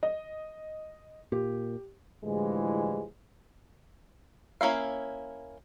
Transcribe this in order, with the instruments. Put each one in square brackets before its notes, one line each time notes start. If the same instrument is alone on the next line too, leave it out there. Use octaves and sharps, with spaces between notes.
[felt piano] D#5
[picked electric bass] A#2 [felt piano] G4
[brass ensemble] A2 D3 E3 F3 G3 G#3
[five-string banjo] A#3 C#4 E4 F5